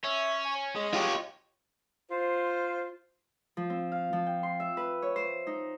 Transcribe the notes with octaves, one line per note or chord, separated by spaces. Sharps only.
C#4 C#5 E5
G#5
G#3 D#5
F4 G4 C#5
F4 C5
F3
C4
F5
F3
G5
C6
E5
B4
C#5
C5
D#4